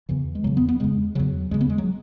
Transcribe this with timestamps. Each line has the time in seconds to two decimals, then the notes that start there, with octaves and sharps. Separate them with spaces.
0.09 E2 C#3 E3
0.35 G#3
0.44 E2 C#3 F#3
0.57 B3
0.69 B3
0.80 E2 C#3 G#3
1.15 E2 C#3 F#3
1.51 E2 C#3 G#3
1.61 B3
1.70 G#3
1.78 F#3